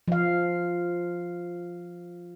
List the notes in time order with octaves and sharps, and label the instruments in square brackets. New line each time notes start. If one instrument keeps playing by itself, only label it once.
[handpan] F3 F5